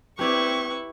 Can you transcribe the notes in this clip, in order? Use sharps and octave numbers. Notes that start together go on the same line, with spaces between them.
C4 E4 G4 B4 C#5 D5 C#6